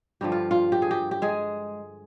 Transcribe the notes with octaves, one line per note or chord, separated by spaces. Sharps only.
G2 D3 F3 G4
F4
F4
G4
G#4
G4
G4
G#3 G#4